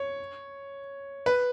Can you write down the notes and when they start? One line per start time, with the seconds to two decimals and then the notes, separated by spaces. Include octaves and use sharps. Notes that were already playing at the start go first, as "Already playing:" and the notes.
Already playing: C#5
1.26 B4